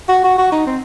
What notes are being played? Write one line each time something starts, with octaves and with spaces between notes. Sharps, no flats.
F#4
F#4
F#4
D#4
C4